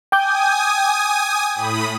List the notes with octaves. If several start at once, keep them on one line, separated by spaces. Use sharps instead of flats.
G5 G#5 D6 D#6 G6
A2 B5 D#6